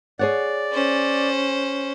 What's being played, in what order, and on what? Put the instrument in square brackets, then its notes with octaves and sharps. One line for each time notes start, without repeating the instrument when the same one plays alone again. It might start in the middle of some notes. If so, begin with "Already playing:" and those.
[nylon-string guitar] G#4 C#5 F#5 [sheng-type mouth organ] D5
[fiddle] C#4 C5